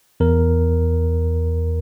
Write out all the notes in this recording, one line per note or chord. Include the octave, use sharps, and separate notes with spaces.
E2 A#4